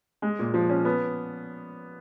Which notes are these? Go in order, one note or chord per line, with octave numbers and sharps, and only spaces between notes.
G#3
A#2
F3
C#4
B3